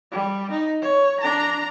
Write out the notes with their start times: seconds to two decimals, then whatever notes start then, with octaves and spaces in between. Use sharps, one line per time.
0.12 G3
0.51 D#4
0.81 C#5
1.20 D4 A#5